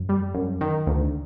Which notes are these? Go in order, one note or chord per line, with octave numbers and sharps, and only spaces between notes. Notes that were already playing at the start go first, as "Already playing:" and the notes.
Already playing: F#2
G3
F#2
D#3
D2